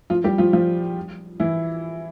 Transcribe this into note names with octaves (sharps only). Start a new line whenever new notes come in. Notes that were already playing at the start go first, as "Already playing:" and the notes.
F3 F4
G3 G4
F3 F4
F3 F4
E3 E4